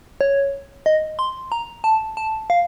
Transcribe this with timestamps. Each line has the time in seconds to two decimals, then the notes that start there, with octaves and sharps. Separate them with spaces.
0.21 C#5
0.86 D#5
1.19 C6
1.52 A#5
1.84 A5
2.17 A5
2.50 F5